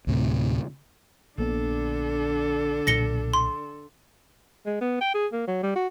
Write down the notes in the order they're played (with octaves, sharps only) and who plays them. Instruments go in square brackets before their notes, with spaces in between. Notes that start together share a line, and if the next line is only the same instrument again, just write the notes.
[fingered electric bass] D2 A2 C3
[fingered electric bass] A#1 A#3 B3 [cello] D3 D4 [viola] A4
[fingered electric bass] B1 A#2 [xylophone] A#6 C#7 G7
[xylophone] C6
[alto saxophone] G#3
B3
G5
G#4
A#3
F#3
G3
F#4